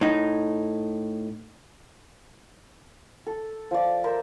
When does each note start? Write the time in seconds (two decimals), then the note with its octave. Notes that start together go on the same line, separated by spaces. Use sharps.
0.01 A2 D#4
3.26 A4
3.71 F3 D5
4.04 A#4 C5 E5